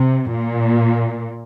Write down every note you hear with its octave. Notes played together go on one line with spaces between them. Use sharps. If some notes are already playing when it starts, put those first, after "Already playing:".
Already playing: C3
A#2